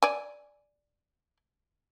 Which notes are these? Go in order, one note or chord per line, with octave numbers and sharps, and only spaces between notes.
D5 G#5